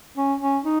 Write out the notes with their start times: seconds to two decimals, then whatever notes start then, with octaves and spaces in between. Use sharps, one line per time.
0.17 C#4
0.41 C#4
0.65 D#4